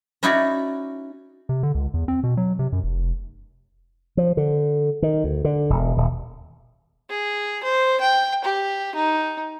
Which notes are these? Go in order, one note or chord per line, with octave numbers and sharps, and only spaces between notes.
C#4 D#4 E4 F#4 C#5 D5
C3
D3
C#2
E2
C4
B2
F#3
C3
F#2
F1
F3
D3
D#3
D2
D3
E1
D#1
G#4
C5
G5
G4
D#4